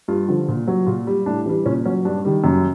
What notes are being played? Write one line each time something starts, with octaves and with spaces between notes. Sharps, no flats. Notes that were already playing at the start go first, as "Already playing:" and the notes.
G2 F4
D3 F3
A#2
F#3
A#2 F4
G3
A2 D4
E3 G3
A#2 C#4
F#3 C#4
G2 D4
D#3 G3
F#2